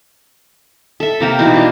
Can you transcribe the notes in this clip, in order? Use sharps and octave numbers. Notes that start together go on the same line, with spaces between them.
A4 E5
C3 A#3 G4
B2 E3 D#4
D4 F4